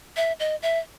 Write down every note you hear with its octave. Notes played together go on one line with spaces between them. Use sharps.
E5
D#5
E5